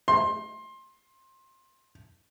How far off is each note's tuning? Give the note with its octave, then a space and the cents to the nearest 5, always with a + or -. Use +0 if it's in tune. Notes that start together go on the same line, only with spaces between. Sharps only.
C6 +20